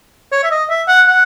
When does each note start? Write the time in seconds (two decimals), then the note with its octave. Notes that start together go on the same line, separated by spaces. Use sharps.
0.32 C#5
0.44 E5
0.51 D#5
0.69 E5
0.88 F#5
1.06 F#5